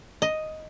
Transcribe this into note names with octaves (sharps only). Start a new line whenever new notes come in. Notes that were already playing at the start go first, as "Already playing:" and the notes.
D#5